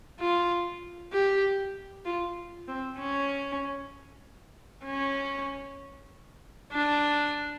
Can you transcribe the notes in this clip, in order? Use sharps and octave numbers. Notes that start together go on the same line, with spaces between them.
F4
G4
F4
C4
C#4
C#4
D4